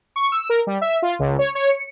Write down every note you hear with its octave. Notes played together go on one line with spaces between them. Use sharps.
C#6
E6
A#4
G3
E5
F4
C#2
C#5
C#5
C#7